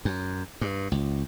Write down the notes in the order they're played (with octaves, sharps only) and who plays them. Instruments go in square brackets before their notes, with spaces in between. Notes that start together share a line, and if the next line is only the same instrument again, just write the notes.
[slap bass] F#2
G2
C#2